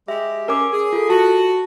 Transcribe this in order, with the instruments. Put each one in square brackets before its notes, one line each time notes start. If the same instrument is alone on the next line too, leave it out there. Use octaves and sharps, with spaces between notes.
[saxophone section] G#3 G4 [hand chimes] E5
[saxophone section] C#4 [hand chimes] A#4 G#5 D6
[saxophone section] G#4
[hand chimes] F4 A4
[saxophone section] F#4 [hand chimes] A5